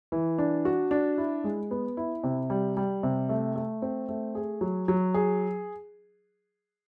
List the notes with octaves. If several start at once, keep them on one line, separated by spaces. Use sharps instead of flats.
E3
D4
F#4
D4
E4
G#3
B3
E4
C3
G3
G3
C3
A3
A3
C4
A3
G#4
F#3
F#3
G#4